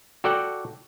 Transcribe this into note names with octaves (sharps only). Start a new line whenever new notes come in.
F#4 A4 D5 F#5 G5